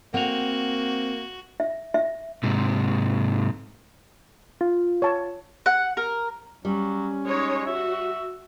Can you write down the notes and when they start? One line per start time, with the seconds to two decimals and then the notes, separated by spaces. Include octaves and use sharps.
0.14 A#3 C4 F#4 F#5 F7
1.60 E5
1.94 E5
2.43 G#2 C3
4.61 F4
5.02 C#5 A5
5.66 F#5
5.97 A#4
6.65 F#3 G3 C#4
7.26 G#3 D#4 C#5
7.66 F#4 E5